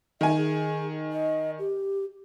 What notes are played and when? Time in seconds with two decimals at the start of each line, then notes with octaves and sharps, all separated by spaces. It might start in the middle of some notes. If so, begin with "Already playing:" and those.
0.21 D#3 E5 G#5
0.37 G#4
1.12 D#5
1.59 G4